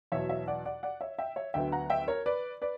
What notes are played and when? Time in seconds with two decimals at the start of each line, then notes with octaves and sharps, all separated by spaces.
0.12 E2 B2 F#3 C#5 E5
0.29 C#5 E5
0.47 D5 F#5
0.65 D5 F#5
0.83 D5 F#5
1.01 C#5 E5
1.19 E5 G5
1.36 C#5 E5
1.54 D2 D3 F#3 B3 E5 G5
1.72 F#5 A#5
1.90 E5 G5
2.07 A#4 C#5
2.26 B4 D5
2.62 B4 D5